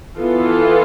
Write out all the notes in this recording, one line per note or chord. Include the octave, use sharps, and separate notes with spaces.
E3 B3 F4 A4